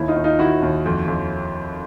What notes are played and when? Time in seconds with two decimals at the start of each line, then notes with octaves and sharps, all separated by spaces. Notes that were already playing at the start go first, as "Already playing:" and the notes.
Already playing: D#2 E4
0.08 D#4 F4
0.16 D#2
0.24 D#4 F4
0.39 D#3 E4 F#4
0.62 D#2
0.86 F2
1.08 F2